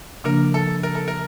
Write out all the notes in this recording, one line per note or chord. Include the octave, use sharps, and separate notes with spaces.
C#3 F3 A#3 D4 A#4
A4
A#4
A4
A#4